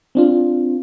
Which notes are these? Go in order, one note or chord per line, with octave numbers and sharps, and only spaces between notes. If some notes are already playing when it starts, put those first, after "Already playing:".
C4 D4 F4